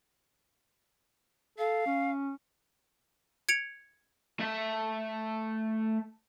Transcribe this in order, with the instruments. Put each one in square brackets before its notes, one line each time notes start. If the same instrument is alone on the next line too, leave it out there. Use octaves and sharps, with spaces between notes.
[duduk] A4 [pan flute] F5
[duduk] C#4
[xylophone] G#6 C#7 D7 F7
[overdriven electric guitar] A3 E5